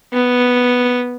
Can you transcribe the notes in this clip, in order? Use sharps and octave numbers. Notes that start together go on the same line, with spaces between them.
B3